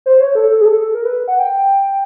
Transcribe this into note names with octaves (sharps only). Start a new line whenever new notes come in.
C5
C#5
A4
A4
G#4
A4
A4
A#4
B4
F#5
G5